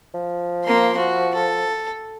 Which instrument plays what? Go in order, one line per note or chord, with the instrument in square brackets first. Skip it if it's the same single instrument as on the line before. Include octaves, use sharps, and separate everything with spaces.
[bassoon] F3
[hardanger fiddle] A#3 C6
F#4
A4